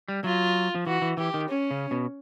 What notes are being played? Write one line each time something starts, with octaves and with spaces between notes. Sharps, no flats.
G3
F#3 F4
F3
E3 F#4
E3
E3 G4
D#3
C#4
C#3
B2